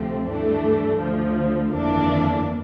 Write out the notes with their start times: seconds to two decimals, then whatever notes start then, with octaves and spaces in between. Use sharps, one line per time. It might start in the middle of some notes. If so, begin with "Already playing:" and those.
Already playing: D2 C3 F3 A3 C4
0.29 G2 E3 A3 D4
1.00 D2 D3 F3
1.73 G1 F2 E3 A#3 D4